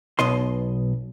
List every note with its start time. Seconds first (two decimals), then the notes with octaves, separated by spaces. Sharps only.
0.19 B1 B2 D#5 C6